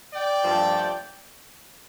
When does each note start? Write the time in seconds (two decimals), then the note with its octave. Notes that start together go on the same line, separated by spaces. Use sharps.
0.14 D5 G5
0.43 G2 F3 A3